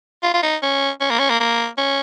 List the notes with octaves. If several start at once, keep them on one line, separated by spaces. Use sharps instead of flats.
F4
F4
D#4
C#4
C#4
A#3
C#4
A#3
A#3
C#4